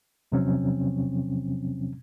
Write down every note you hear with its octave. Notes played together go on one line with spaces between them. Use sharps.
E2 C3 F3 F#3 C4 C#4